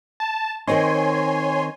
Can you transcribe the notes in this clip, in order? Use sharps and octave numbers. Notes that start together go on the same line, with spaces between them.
A5
D#3 C4 D#4 C#5 G#5 C6